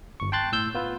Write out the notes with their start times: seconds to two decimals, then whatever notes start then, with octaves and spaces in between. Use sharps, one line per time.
0.20 G1 C#6
0.32 G5 A5 C6 F#6 A6
0.52 A2 E6 G6
0.74 B3 F4 B4